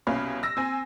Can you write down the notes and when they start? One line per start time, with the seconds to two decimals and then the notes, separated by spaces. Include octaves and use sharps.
0.07 C2 B2 C#4 F5 B5
0.43 E6 A#6
0.57 C4 G#5